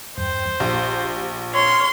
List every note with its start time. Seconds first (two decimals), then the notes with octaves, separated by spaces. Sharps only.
0.18 E2 G2 C5 G5
0.60 A#1 G4
1.53 C#5 C6 F6